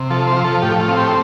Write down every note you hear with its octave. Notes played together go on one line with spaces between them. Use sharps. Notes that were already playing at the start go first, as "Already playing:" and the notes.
Already playing: C3
F3 A4
C5
F3
A4
A2 G4
F4
C4
G4